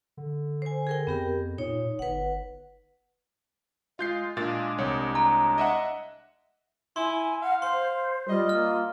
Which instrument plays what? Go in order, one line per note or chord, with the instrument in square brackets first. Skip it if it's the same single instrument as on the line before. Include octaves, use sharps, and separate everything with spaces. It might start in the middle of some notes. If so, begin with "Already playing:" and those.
[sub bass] D3
[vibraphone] C5 G#5
G#4 A#4 G5
[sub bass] F2 [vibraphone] B3 G4 A#4
[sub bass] A#2 [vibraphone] D#4 C#5
[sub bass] G1 [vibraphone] B4 F#5
[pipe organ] G#3 [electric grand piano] F4 G6 C7
[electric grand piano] A#2 F5 A6 [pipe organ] G#3 D4 D6
[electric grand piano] C2 C#5
[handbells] A#5
[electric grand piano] D#5 E5 F#5
[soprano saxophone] E4 [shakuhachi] G#5 [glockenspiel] C6
[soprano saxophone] F5 [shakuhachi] F#5
[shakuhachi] C5 [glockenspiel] C6
[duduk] G3 [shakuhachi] F4 [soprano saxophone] D#5
[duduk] A#3 [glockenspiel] F6